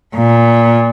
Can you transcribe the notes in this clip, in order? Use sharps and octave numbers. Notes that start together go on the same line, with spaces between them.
A#2